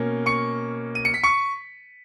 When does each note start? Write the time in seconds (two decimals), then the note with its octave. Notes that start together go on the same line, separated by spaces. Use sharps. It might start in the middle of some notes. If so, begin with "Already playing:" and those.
Already playing: B2 A#3 C#4
0.26 C#6 C#7
0.95 D#7
1.05 C#7
1.14 B6
1.23 C#6 C#7